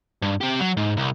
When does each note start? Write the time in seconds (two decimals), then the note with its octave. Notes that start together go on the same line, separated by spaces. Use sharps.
0.22 G2
0.41 C3 G4
0.60 F#3
0.77 G#2
0.97 C2